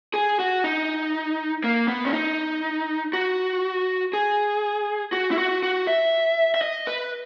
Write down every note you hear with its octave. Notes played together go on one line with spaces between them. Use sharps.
G#4
F#4
D#4
A#3
B3
C#4
D#4
F#4
G#4
F#4
E4
F#4
F#4
E5
E5
D#5
B4